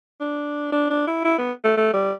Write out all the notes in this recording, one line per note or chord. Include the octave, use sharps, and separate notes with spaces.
D4
D4
D4
E4
E4
B3
A3
A3
G3